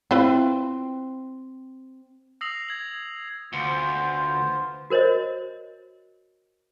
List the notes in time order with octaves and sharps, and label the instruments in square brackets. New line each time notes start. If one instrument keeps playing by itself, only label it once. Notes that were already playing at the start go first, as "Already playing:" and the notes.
[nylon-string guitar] C4 [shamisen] E4 F4 B4
[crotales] D#6 E6 A#6 C7 F7 F#7
G#6 F#7
[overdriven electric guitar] D2 [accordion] B3 F4 C5
[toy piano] F#4 A#4 C5 C#5 D#5